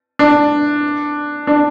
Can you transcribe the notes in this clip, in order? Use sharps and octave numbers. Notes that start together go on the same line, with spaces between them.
D4
D4